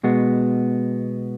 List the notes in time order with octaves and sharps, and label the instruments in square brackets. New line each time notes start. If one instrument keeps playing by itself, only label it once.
[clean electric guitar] B2 G#3 B3 F#4